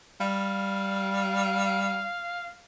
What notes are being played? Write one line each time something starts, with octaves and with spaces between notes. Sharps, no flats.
G3 F5